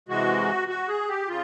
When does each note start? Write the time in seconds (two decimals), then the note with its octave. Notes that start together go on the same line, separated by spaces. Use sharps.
0.09 C3 E3 G#3 F#4
0.68 F#4
0.88 G#4
1.08 G4
1.28 C#3 F4